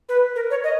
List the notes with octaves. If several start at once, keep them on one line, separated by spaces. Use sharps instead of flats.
B4
A#4
C#5
D#5